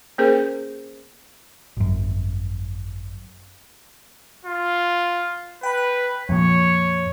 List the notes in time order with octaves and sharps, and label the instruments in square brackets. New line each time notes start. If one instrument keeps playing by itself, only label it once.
[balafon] A#3 C#4 G#4 A#4 C5
[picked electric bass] G#1 F#2
[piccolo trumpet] F4
[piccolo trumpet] B4 [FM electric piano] G5 B5
[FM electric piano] F2 A#2 [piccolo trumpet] C#5